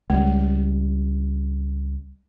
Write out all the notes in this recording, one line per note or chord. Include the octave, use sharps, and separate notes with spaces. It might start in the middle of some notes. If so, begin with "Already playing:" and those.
C#2 G3 G#3